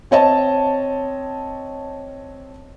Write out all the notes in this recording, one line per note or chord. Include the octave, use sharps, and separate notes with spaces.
C4 C#5 D#5 A5